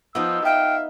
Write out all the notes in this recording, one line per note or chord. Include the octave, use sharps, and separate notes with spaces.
F3 B3 D#4 E6
E5 F5 G5